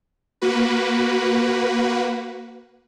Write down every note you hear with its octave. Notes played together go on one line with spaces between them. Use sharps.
A#3 F#4 B4